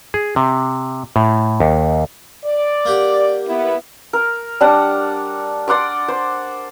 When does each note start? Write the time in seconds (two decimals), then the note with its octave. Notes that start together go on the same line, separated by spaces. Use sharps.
0.14 G#4
0.36 C3
1.16 A2
1.60 D#2
2.44 D5
2.85 A#3 G4 F#5
3.46 B3 E4
4.13 A#4
4.61 G3 D4 F#5
5.68 D5 F#5 C6 D6
6.08 C5